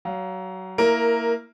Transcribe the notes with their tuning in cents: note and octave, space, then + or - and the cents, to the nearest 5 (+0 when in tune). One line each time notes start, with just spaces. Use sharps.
F#3 +25 F5 +0
A#3 -10 E4 +0 A#4 +5